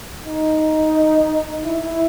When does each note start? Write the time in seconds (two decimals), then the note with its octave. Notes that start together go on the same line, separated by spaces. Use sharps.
0.24 D#4
1.65 E4